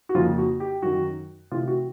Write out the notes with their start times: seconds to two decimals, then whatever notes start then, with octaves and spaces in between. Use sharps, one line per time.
0.09 F#4
0.15 F2 C#3 F3 A#3 F4
0.38 F#4
0.60 G4
0.82 F#2 D#3 F#3 F#4
1.51 C3 E3 A3 C4 E4 F4
1.68 F#4